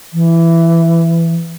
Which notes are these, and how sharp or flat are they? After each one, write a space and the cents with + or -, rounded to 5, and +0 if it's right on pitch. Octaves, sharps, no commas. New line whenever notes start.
E3 +15